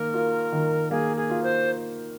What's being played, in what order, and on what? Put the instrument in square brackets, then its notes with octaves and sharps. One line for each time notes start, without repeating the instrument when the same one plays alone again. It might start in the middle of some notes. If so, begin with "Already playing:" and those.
Already playing: [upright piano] D#3 A#3 [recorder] A#4
[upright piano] F4
D#3
[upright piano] A#3 [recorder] G#4
[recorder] G#4
[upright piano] F4
[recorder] C5